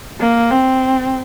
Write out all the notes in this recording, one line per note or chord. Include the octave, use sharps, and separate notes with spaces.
A#3
C4